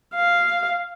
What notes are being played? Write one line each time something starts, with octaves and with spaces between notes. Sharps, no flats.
F5